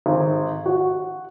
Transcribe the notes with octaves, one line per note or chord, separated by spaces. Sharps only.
G#1
F#4